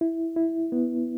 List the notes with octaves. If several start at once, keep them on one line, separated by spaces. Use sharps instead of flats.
E4
E4
B3